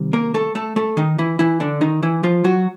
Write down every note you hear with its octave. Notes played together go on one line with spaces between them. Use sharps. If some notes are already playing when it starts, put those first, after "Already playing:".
Already playing: C3 D#3 G3
A#3 A#4
A3 A4
A3 A4
A3 A4
D#3 D#4
E3 E4
E3 E4
D3 D4
D#3 D#4
E3 E4
F3 F4
F#3 F#4